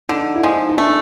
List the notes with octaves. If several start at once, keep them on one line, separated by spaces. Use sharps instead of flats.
D3 D#4
E4
F3 G#3 D#4
D#4
A3 D4